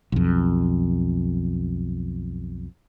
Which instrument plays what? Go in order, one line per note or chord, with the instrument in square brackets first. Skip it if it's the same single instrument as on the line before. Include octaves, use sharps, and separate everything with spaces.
[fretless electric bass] B1 F2